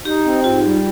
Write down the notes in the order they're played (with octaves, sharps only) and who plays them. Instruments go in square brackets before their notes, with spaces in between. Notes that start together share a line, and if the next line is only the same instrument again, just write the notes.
[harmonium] D#4 [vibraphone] G4
[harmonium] C4
[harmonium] G#2 [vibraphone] F4
[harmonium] G3